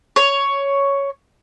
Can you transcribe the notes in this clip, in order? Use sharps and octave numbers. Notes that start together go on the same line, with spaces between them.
C#5